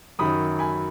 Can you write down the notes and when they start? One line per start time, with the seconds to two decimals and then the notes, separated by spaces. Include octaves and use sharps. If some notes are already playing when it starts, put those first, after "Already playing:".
0.19 F#2 D#3 F#3 B5 D#6
0.59 G#5 B5